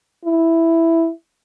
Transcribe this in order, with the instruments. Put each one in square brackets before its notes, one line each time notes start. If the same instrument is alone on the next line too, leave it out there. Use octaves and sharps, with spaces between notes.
[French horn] E4